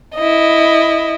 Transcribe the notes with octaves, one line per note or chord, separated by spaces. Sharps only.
E4 D#5